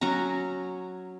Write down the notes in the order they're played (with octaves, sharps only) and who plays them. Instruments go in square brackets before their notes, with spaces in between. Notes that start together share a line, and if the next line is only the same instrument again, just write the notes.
[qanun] F#3 C#4 F#4 A#5